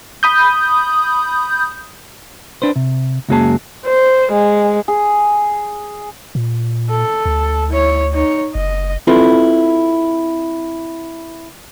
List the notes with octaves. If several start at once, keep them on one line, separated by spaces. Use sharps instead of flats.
B5 D#6 G6
D4 B4 C5
C3
C#2 F#2 F#3 A#3 G#4 A5
C5
G#3
G#4
A#2
A4
D2
E4 C#5
D#4 C#5
F#1 D#5
C4 E4 F4 A4 B4